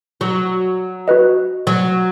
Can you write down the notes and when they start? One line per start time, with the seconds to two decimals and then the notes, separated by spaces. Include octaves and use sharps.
0.21 F#3
1.08 F#4 B4 D#5
1.67 F#3